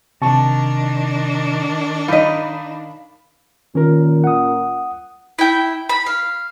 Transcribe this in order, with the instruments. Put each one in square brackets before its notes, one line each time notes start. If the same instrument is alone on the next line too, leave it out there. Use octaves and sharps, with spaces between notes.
[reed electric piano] C3 C#6 [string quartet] D#3 D4 [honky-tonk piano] A5
[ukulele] D#4 D#5 [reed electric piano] F5 [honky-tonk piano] B5 B6
[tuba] A#2 [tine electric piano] D#3 [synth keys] C#4 A#4
[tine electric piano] F#5 D#6
[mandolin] E4 G5
B5
F5